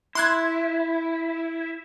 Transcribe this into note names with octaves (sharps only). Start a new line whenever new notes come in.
E4 C6 F#6 G#6